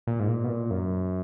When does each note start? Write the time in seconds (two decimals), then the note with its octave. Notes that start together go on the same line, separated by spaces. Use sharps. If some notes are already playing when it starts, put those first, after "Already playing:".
0.07 A#2
0.20 G#2
0.29 A#2
0.44 B2
0.50 A#2
0.71 F#2